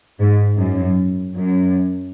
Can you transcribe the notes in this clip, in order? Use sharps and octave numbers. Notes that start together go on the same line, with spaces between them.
G#2
F#2
F#2